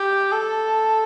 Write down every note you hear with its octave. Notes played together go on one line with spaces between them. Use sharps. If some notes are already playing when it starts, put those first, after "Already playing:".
Already playing: G4
A4